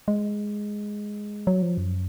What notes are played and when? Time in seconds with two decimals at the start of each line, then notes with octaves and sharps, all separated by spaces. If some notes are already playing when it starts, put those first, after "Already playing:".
0.08 G#3
1.47 F#3
1.62 F3
1.78 F#2